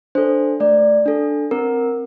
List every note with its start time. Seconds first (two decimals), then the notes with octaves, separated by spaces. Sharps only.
0.15 D4 A4 C5
0.60 A3 D5
1.06 D4 A4
1.51 C4 A#4